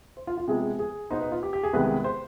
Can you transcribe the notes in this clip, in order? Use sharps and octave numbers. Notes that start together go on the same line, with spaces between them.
C5
F4
F4
C3 F3 G#3 B3 G#4
G#4
B2 B3 D#4 C5
B4
F4
G4
G4
G#4
C2 C3 D#3 G#3 B3 B4
C5